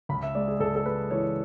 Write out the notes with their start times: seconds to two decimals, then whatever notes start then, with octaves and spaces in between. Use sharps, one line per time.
0.09 C#2 B5
0.23 E5
0.35 G#3 D5
0.48 G#4
0.60 C#2 A4
0.76 A4
0.86 G#3 B4
1.11 E3 C#5